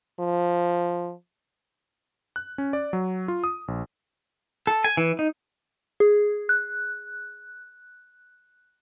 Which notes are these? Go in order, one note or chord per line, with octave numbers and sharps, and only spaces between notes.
F3
F#6
C#4
D5
F#3
F4
D#6
A#1
A4
G#5
E3
D#4
G#4
F#6